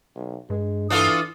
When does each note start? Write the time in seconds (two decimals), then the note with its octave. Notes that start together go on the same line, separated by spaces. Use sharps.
0.15 B1
0.50 G2 G#3
0.90 E3 D4 F4 A4 D#6